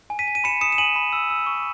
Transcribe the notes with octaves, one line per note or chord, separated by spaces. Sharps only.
G#5
B6 D#7
G#5
D#7
B5 C#7 E7
D#6 C#7 E7
E7
G#5 D#7 F#7
B5
E6
E6
C#6